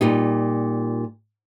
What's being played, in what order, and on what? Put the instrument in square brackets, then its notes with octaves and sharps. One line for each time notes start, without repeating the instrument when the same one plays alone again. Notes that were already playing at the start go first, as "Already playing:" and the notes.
[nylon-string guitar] A#2 G3 D#4